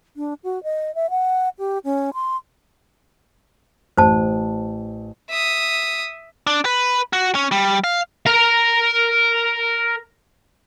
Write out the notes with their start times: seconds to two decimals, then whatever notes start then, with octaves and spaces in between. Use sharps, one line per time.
0.17 D4
0.44 F#4
0.64 D#5
0.95 E5
1.10 F#5
1.59 G4
1.84 C#4
2.14 C6
3.97 A1 C5 A5
5.30 E5 D#6
6.47 D4
6.65 B4
7.13 F#4
7.35 C#4
7.52 G3
7.84 F5
8.26 A#4 A#5